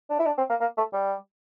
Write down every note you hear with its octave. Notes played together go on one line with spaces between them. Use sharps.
D4
E4
D4
C4
A#3
A#3
A3
G3